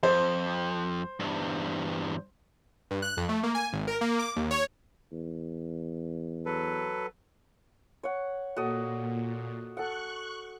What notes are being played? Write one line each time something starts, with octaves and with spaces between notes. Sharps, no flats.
F2 C5
E2 G2
G2
F#6
F2
A3
A#3
G#5
G#1
A#4
A#3
D6
D#2
C#5
E2
F#3 A4 B4
C#5 F#5
A#2 F#4 A4 D#5
A4 F#5 C#6 F#6